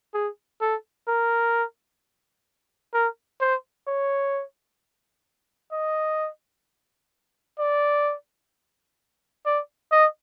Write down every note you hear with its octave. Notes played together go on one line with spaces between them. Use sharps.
G#4
A4
A#4
A#4
C5
C#5
D#5
D5
D5
D#5